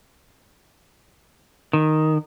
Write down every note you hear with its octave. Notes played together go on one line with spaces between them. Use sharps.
D#3